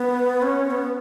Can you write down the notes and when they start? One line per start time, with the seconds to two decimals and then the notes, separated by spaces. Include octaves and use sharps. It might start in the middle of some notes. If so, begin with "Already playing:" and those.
Already playing: B3
0.42 C#4
0.71 B3